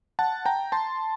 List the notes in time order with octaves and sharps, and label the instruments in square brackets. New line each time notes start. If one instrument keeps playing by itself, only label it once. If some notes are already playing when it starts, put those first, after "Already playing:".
[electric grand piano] F#5 A5
G5 A#5
A5 C6